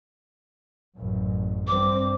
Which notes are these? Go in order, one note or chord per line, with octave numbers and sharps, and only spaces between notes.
A1 F#2
G2 C4 D6